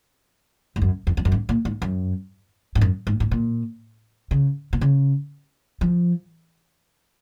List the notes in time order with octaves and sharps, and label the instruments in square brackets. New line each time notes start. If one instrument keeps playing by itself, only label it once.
[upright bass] G#2
F#2
F2
F2
F#2
G#2
A#2
G#2
F#2
G#2
F#2
G#2
G#2
A#2
C#3
B2
C#3
F3